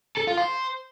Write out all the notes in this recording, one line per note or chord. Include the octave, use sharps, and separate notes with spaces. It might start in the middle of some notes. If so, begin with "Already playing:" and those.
A4
F4
C5